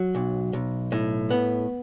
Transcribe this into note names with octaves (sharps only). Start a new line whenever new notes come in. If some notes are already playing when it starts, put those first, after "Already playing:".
Already playing: F#3
B1
B1
A2
B3